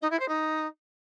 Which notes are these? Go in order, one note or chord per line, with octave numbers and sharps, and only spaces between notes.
D#4
E4
C5
D#4